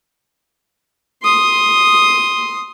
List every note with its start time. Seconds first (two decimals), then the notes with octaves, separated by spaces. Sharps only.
1.23 C6 D#6